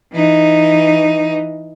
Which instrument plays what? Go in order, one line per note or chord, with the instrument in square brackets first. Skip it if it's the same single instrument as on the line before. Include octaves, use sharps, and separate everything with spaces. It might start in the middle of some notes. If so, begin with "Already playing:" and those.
[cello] E3 D#4